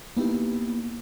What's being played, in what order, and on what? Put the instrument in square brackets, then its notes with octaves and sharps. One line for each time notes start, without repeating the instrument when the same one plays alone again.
[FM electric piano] A#3 B3 D#4 E4 G4